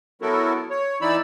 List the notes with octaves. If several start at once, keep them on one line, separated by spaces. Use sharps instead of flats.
F#3 B3 E4 F#4 A4 A#4
C#5
E3 D#4 E4 D5 B5 E6